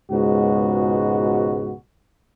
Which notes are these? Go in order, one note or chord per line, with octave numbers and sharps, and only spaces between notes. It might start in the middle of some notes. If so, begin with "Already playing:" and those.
C#2 G#2 B2 F#4